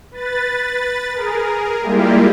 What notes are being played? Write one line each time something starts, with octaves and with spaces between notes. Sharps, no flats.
B4 A6
G#4 A#4
G3 G#3 A#3 E4 F4 G4